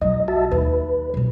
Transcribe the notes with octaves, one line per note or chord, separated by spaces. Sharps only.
B1 F#3 D#5
F#4 E5 A5
D#2 B4
B1 B2